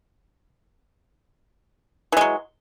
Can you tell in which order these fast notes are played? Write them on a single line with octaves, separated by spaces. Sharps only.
E3 G#3 F#3